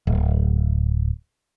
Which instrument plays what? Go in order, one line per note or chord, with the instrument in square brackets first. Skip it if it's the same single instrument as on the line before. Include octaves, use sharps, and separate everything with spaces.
[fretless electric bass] D1